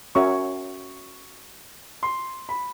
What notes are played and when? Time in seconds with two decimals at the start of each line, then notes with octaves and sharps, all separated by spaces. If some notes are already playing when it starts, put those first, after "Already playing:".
0.15 C#4 F#4 A#4 C#5 E5 C#6
2.03 C6
2.49 B5